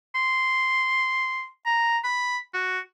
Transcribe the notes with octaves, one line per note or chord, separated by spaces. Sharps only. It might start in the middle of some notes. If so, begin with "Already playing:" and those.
C6
A#5
B5
F#4